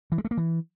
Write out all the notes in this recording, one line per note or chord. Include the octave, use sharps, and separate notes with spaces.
E3
G#3
A3
A#3
E3